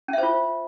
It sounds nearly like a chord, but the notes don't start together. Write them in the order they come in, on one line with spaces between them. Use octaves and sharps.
C#4 E5 C5 F4